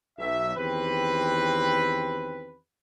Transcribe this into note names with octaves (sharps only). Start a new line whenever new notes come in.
B1 E5
E2 D#3 C4 G4 B4